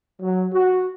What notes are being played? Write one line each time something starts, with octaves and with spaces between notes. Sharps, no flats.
F#3
F#4